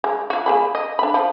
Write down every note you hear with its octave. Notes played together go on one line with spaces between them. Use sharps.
G#3
F4 F#4
A#3 G#4 B5
D#5
D4 B5
F3